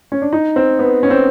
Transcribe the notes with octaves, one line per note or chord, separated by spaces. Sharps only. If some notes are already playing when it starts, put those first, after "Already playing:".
C#4
D4
D#4
C4
B3
C#4
C4